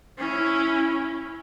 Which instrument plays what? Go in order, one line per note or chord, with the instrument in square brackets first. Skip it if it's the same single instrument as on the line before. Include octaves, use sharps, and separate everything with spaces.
[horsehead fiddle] C#4 E4